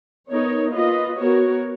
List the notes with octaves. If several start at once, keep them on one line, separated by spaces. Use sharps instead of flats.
B3 D#4 A#4 C#5
A#3 F4 B4 D#5
B3 F#4 A#4 C#5